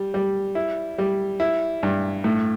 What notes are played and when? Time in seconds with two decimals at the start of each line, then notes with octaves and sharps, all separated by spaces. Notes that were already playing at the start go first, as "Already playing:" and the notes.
Already playing: G3
0.14 G3
0.55 E4
0.98 G3
1.40 E4
1.83 G2
2.24 A2